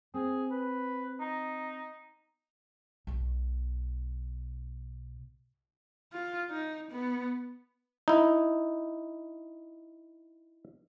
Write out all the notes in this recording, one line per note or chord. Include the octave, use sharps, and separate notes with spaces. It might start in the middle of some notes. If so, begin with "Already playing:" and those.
C4 G#4
B4
D#4
B1 B2
F4
D#4
B3
D#4 E4